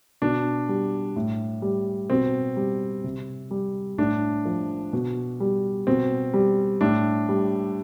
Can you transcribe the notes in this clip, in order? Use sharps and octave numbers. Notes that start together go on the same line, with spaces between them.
B2 D4
G3
A2
G3
B2 C4
G3
C3
G3
A2 D4
F3
B2
G3
B2 C4
G3
A2 D4
G3